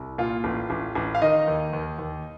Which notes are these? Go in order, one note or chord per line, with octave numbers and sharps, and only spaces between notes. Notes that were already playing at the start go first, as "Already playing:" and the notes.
Already playing: C2
A#2 F4
A1
A1
A1
F5
D#3 D#4 D#5
D#2
D#2
D#2